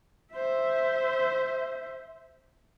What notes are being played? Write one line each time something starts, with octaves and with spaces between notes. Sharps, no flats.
C5 E5